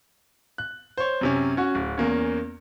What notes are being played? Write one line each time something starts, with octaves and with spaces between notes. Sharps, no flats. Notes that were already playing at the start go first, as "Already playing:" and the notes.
F#6
C5 C#5
F#2 C3 C#4
C#4 F#4
D1
E2 A#3 C#4